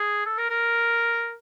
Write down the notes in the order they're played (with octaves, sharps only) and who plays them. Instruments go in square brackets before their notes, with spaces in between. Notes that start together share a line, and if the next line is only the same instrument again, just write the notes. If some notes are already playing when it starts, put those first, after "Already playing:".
Already playing: [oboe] G#4
A4
A#4
A#4